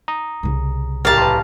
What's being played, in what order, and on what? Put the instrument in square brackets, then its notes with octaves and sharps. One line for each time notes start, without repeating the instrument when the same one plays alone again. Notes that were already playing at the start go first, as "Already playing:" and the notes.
[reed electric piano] A#5 D#6
[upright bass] C2 C#3
[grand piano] D1 G4 A#5 [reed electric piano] A#4 [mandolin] F5 A5
[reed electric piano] B4 C6